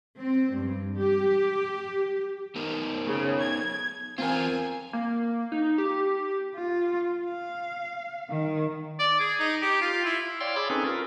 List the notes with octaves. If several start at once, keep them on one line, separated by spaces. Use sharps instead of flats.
C4
G2
G4
B3 D#4 A#4
C#3
G#6
E2 C4 F4 A#4 G#5
A#3
D#4
G4
F4
F5
D#3
D5
G#4
D#4
G4
F4
E4
C#5 D5 F5 G5 C6 E6
G#4 B5 D6 E6
C4 C#4 D#4 G#4 A4 B4
F4 A#4